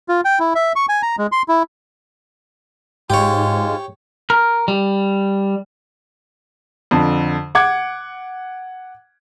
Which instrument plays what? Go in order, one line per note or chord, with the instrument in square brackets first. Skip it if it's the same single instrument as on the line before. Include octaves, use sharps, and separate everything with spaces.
[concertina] F4
G5
E4
E5
C#6
G#5
A#5
G#3
C6
E4
[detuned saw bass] G#2 [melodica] G#3 F4 [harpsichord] G4 C#5
[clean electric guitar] A#4
G3
[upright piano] F2 D3
F#5 D6 G#6